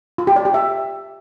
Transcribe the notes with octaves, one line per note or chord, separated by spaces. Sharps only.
F4
G4
D5
G4
E5